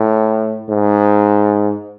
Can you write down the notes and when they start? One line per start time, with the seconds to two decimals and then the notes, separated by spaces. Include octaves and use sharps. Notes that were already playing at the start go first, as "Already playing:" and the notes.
Already playing: A2
0.69 G#2